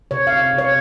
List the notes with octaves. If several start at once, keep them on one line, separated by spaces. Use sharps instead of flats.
C3 C#5
F5
C3
C3
C#5